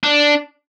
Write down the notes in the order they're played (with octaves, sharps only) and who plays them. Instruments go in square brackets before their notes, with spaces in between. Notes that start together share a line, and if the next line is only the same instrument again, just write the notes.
[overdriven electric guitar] D4